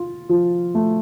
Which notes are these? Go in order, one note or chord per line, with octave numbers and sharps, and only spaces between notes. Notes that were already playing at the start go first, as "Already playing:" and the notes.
Already playing: F4
F3
A3